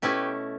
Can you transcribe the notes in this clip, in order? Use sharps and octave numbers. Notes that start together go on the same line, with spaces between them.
B2 A3 C#4 E4 G4 B4